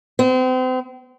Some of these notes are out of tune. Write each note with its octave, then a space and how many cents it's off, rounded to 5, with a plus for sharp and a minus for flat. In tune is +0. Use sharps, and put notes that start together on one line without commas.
C4 -35